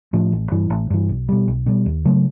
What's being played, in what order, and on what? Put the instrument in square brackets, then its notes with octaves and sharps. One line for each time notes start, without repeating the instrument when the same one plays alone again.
[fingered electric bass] A2 F3
A1
G2 E3
A1
G2 E3
B1
B2 G3
B1
B2 G3
D#2
C#3 F#3 A3